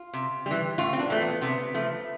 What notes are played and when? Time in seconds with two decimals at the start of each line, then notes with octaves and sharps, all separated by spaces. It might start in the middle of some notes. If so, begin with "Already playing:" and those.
Already playing: F4
0.14 C3
0.46 E3 G3
0.78 A2 F4
0.93 C4
0.99 D4
1.10 E3 A3
1.21 B3
1.41 C3 B3
1.74 F3 A3